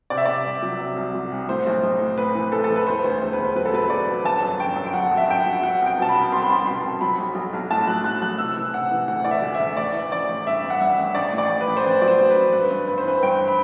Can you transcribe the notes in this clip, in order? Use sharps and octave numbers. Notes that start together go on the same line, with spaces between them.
C3 D5
E5
C3 D5
C2
F#3
C3
C2
F#3
C2
A2 C5
B1
B1
A2
A2 B4
E3
A2 A4
A4
E3
B4
E1 C5
D2
C5
E1
B4
E1
F#3 B4
A4
F#3 B4
E1 D5
E1
G1 A5
F#2
G1 G5
F#2
G5
F#2 F#5
F#2
E5
F#2 G5
F#5
F#3
F#3 F#5
C2
G5
B2 A5
B5
C2
C2 C6
B5
C2 C6
B2 C6
C2
F#3 B5
B1
B1
B1
A2 A5
F#3 F#6
B1 F#6
B1 F#6
C3 E6
E3
C3 F#5
E3
D2 F#5
E3 D5
E5
D2
E5
D2
A1 D5
E3
A1 D5
A1
G2 E5
G2
F#5
G2 E5
A1
A1 D5
A2
D5
A1
B4
A1
C5
A1 D5
F#3 D5
C5
F#3
B4
A1
G2 B4
G2
G1 B4
C5
E3 B4
G2 G5
B5